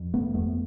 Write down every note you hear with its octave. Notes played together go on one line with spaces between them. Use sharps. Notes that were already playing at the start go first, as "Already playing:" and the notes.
Already playing: F2
G1 A3 B3
F2 A3 B3